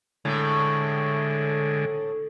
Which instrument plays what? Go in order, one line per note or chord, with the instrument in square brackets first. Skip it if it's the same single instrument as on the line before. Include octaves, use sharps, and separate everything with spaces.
[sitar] A2 [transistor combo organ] D3 G#3